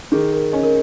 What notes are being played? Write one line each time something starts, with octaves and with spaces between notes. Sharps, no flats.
D#3 G#4
A#4
C#4 D#5
A#4